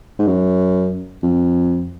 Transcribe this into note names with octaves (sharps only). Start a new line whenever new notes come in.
G#2
F#2
F2